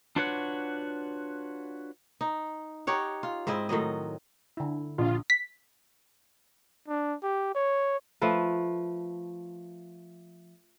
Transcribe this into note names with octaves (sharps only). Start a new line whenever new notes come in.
D4 F4 F#4 B4 C#5 F#5
D#4
D#4 G4 C#5 F#5
F4
G#2 C4 E4 D#5
A2 D#3 F#3 D#5
D3 E4
A#1 F4
B6
D4
G4
C#5
F3 A3 B4